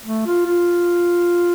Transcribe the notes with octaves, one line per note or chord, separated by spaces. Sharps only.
A3
F4
F4